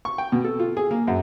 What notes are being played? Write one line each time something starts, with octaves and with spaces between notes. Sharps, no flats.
C#6
G5
B2
A4
F4
G#4
A#3
F#2